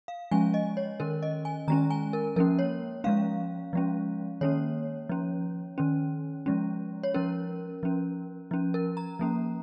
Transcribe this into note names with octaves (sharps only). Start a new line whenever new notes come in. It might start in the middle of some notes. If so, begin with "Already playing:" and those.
F5
F3 G#3 C#4 G#5
D#5
C#5
D#3 C#4 A#4
D#5
G#5
D#3 G#3 C#4 A#5
G#5
A#4
F3 A#3 C#4 A#4
C#5
F3 G#3 C#4 F5
F3 G#3 C#4
D#3 A#3 C#4 C#5
F3 C#4
D#3 C#4
F3 G#3 C#4
C#5
F3 C#4 A#4
F3 C#4
F3 C#4
A#4
A#5
F3 A#3 C#4